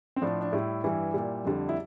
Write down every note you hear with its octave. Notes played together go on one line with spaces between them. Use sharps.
C4
A2 F3 D4
D4
A2 G3 E4
G2 E3 G3 E4
A#2 G3
F2 D3 G3
E4